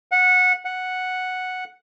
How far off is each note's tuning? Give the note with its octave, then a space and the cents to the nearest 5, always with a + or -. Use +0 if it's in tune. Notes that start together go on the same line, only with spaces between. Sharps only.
F#5 -15
F#5 -5